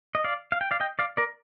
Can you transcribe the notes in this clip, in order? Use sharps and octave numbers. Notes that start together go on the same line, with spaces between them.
D#5
D5 F5
F5
G5
D5 F5
D#5 G5
D5 F5
A#4 D5